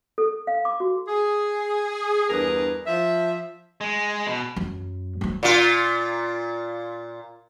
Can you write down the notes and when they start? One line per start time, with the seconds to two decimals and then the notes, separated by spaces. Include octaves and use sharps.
0.18 A4
0.47 F5
0.65 D6
0.80 F#4
1.08 G#4
2.30 E2 G2 D4 G#4 A#4 B4
2.87 F3 E5
3.81 G#3
4.28 B2
4.56 F#2
5.21 F#3 C4
5.43 A#2 F4